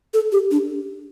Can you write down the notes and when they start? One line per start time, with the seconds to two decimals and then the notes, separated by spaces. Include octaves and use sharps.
0.14 A4
0.32 G4
0.51 D4